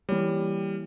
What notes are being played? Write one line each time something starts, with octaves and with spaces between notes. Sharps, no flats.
E3 G3 A#3 C#5